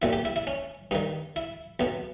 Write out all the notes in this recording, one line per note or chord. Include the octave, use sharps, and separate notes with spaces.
B1 A#2 E4
G4
E4
E4
C#4
G2 D#3 D#4
E4
B1 B2